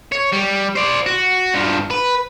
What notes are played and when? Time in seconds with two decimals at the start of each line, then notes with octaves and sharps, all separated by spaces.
0.12 C#5
0.32 G3
0.76 C5 D5
1.06 F#4
1.54 G2 F3
1.90 B4